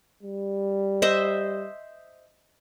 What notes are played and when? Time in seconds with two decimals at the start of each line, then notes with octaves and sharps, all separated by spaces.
0.23 G3
1.02 C5 D#5 E5